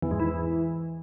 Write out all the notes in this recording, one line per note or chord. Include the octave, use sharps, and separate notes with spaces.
E2
G#2
E3